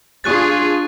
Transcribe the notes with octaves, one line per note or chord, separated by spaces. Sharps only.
D4 F4 G#4 C#6 F#6 A6